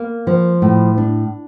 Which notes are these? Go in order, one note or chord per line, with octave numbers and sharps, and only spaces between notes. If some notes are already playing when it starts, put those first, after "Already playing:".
Already playing: A#3
F3
A2
D4